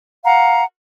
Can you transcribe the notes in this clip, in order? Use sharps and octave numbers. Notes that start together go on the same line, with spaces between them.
F5 F#5 A#5